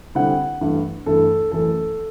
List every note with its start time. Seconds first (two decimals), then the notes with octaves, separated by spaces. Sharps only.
0.15 D3 G3 C4 E4 F#5
0.61 G2 E3 A3 E4
1.06 G2 E3 A3 E4 A4
1.51 F#2 E3 A3 E4 A4